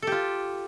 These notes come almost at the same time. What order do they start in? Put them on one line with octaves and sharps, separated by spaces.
A4 G4 F4